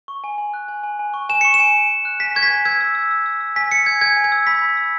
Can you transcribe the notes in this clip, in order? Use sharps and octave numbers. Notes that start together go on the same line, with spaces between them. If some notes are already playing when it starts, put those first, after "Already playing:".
C#6
G#5
G#5
F#6
G#5
G#5
G#5
C#6
G#5 E7
C#6 C#7
E7
G#5
G#5
G#5
F#6
G#5 B6
C#6 G#6
B6
G#5
E6 G#6
E6
E6
E6
E6
E6
G#5 B6
E6 C#7
G#5 G#6
G#5 G#6
G#5
G#6
E6
B5 B6
B5
E6